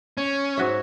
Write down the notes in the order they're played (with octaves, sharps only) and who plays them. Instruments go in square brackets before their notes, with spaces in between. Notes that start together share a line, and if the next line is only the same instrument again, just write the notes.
[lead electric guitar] C#4
[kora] G#2 F#4 E5